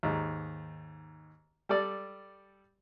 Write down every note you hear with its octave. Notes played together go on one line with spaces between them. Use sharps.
D#2 G#2
G3 A4 D5